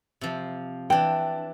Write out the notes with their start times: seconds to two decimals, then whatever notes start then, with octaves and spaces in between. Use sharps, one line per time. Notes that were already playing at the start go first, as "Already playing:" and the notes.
0.21 C3 F3
0.90 E3 D4 G5